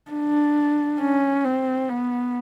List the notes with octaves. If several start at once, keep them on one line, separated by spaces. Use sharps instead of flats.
D4
C#4
C4
B3